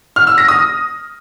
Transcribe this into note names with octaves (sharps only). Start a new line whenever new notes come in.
F6
E6
A#6
D#6